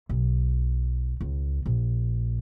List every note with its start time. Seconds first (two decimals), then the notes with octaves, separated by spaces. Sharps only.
0.09 B1
1.21 C#2
1.66 A#1